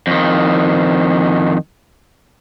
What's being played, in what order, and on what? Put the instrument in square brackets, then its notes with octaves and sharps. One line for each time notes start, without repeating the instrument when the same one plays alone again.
[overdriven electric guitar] F2 D#3